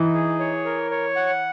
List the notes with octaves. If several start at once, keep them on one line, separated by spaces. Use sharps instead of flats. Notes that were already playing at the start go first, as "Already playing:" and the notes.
Already playing: E3 D#4
G#4
C#5
A#4
C#5
F#5